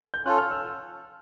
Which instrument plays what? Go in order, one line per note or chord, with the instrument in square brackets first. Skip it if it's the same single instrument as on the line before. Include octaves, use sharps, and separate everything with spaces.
[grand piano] G6
[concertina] C#4 F4 A4 [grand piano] F#6
[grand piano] F6
E6